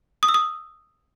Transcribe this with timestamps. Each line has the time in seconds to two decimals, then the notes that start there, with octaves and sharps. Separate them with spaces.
0.23 D#6
0.29 E6
0.34 D#6